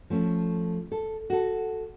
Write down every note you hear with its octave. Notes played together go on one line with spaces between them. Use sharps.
F3 A3 C#4
A4
F#4 A4